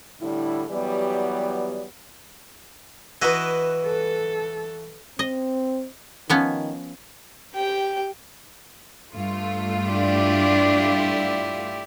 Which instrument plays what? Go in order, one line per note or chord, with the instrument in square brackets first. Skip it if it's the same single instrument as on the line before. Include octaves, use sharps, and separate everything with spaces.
[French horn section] A2 D3 G3 E4
E3 F#3 G3 B3 G4 D5
[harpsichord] E3 E4 F#4 [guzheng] B4 D#5
[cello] A4
[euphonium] C4 [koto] D#5
[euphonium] D#3 [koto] F3 B3 C#4
[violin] G4 G5
[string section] G2 A3 F4
[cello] D4 [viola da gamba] E4 G4 D5